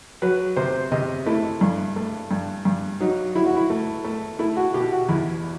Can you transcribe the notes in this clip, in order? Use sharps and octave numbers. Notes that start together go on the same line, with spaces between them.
F#3 B4
C3 C5
C3 D#5
A3 E4
G2
A3
G2
G2
F#3 D#4
F#3 E4
F#4
E4
A3
A3
A3 E4
F#4
B2 G4
F#4
E2 E4